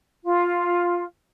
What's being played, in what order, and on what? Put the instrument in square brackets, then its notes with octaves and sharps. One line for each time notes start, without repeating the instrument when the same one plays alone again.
[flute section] F4